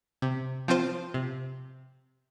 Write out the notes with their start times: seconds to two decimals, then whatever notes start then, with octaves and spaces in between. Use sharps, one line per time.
0.22 C3
0.68 F3 C4 F4 C5
1.14 C3